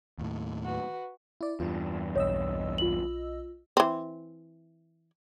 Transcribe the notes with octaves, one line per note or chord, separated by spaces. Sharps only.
D#2 A2
F#4 B4
E4 D5
E2 G2 F4
B1 C#5 D#5 E6
F4 F#7
E3 C4